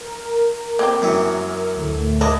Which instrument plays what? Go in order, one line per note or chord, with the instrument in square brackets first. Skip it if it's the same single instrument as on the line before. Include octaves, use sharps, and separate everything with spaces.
[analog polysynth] A#4
[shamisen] A#3 C4 G4
[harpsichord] F#2 E3 F#3
[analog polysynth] D2 A2 A3
[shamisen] A#3 D4 E4 [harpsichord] D#5